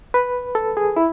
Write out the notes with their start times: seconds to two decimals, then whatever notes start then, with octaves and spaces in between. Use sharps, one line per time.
0.14 B4
0.55 A4
0.77 G#4
0.96 E4